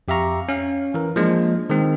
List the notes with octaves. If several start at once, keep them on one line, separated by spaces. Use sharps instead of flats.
F2 G4 E5 F5 A#5 C#6
C#4 F5
E3 A#4
F3 G#3 A#3 D4
D#3 G#3 C4